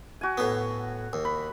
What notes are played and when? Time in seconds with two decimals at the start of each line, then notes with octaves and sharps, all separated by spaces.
0.21 F#4 G#5
0.38 A2 B3
1.13 D#2
1.25 B5